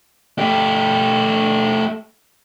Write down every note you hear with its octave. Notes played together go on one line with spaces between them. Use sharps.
A3 G4